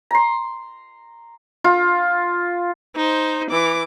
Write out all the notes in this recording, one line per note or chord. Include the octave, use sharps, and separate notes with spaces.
A#5 C6
F4
D#4 C5
E3 D6